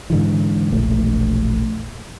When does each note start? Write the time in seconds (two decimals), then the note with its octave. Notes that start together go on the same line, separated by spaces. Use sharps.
0.10 G#2 D3 E3
0.70 E1 A#1 A3